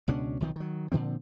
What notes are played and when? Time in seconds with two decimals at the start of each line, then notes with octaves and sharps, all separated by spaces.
0.08 C#2 B2 C#4 D4
0.40 B1 C3 D#3 F3
0.56 D#3 F#3
0.92 A#2 D3 F3 C4